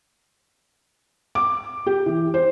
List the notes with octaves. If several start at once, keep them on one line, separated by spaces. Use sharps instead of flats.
D6
G4
E3
C5